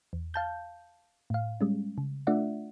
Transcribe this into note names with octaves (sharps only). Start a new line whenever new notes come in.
E2
F5 A5 G6
A2 F5
G3 G#3 C#4
C#3
A3 D4 F4 D5 E5 F#5